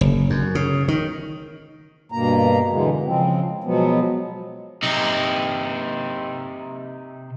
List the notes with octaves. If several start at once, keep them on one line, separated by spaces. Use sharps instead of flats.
F#1
F#2
C#3
D#3
G2 B2 A#3 A#5
E2 B2 D3 E3 G#3
C#3 F3 G#3 C4
B2 F3 F#3 G#3 B3
C3 D#4